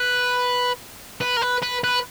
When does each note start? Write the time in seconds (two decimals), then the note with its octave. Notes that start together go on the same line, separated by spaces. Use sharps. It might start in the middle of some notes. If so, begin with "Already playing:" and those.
Already playing: B4
1.21 B4
1.37 A#4
1.42 B4
1.63 B4
1.84 B4